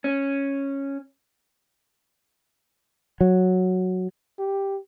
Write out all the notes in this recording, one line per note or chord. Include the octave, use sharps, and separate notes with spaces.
C#4
F#3
G4